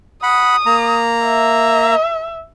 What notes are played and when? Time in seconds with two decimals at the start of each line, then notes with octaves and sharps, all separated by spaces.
0.23 F#5 B5 D#6
0.66 A#3 A#5
1.24 E5